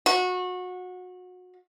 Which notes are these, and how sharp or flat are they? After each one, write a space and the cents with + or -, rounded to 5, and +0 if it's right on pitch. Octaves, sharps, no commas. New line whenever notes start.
F#4 -25